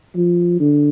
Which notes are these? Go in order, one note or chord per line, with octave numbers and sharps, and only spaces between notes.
F3
D3